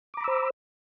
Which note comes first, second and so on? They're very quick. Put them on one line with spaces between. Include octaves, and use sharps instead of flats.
D6 A#5 B5 E6 C5